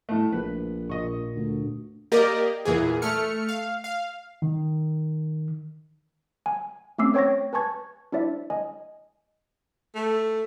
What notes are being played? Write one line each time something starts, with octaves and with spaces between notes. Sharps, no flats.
A2 A3
A#1 B4
A#2 D#5 C#6
D2
A#3 G4 A#4 D5 D#5
E2 A#2 E3 G#4
A3 F6 C#7
F5
F5
D#3
G#5
A3 C4 C#4 D6 E6 C7
C5 C#5 G5 C#6 G#6 A#6
B4 G#5 A5 C#6 G#6
D4 E4 C5 D5 E5
D#5 G#5
A3